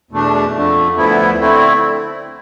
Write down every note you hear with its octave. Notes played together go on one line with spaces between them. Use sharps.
E2 B2 A3 D4
F2 D3 A3
D2 D3 F3 B3 E4
D3 A3 C4 E4